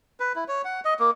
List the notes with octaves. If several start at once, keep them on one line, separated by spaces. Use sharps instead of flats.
B4
E4
C#5
F#5
D#5
A#3